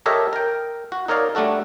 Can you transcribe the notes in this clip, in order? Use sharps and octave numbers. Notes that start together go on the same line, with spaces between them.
G4 A4 A#4 C#5 D#5 E5
A#4 G5
F#4
D#4 A#4 C#5 D5 F5
G3 A3 D4 F#4 A4